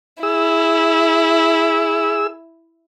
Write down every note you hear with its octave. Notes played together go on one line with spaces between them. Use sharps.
E4 G#4 E6